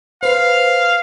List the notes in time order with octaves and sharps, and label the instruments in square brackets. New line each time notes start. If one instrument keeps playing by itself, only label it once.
[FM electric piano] B4 C5 [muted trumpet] F5